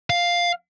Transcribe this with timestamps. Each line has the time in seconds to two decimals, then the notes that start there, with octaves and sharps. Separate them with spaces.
0.10 F5